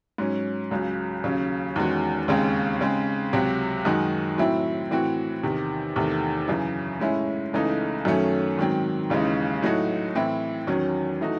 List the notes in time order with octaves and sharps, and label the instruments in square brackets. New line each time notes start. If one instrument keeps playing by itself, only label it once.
[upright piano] G#2 F#3 C#4
C#2 C#3 F#3
D#2 C#3 F#3 C#4
E2 D#3 G#3 C#4 F#4
D#2 C#3 G#3 C4
C#3 G#3 C4
C#2 C3 F#3 C4 F#4
F#2 D#3 G#3 D#4 F#4
A2 F#3 C4 E4
A2 E3 C4 F#4
E2 C3 D#3
E2 C3 D#3 A3
F#2 C#3 E3
A2 G#3 C#4 E4
C#2 C#3 E3 A3 D#4
F#2 D#3 F#3 A3 C#4
G#2 D#3 F#3 C4
D#2 C#3 E3 G#3 D#4
A2 F#3 A3 D#4 F#4
A2 E3 C4 E4
E2 D#3 F#3 C#4
E3 A3 D#4 F#4